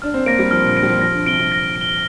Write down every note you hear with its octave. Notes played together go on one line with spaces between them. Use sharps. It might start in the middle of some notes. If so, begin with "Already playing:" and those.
D4 F6
C4
A#3 A#6 D7
G3
F3 F6
A#2
D3 A#6 D7
G3
F3
F3 A#6
D3
C3 D7 G7
C3
A#6
D7
G7